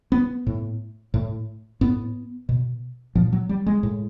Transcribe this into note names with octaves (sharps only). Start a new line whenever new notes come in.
B3
A2
A2
A2 B3
B2
A#2 F3
F#3
G3
G#3
A2